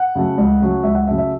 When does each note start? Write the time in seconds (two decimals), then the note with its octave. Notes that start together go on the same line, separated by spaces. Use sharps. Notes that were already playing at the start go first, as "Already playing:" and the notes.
Already playing: F#5
0.15 C#3 F#3 A3
0.38 C#2
0.61 C#3 F#3 A3
0.83 C#2 E5
0.95 F#5
1.07 C#3 F#3 A3 E5
1.18 E5